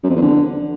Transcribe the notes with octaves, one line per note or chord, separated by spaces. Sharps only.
F#2
F2
E2
D3